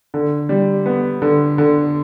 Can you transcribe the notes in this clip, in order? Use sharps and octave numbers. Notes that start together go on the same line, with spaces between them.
D3
G3
B3
D3
D3